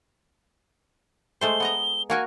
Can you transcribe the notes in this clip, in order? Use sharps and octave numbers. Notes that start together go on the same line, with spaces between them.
G#3 A3 C5 G7
B3 D#5 A#5
A#3 F#4 A#4 G#5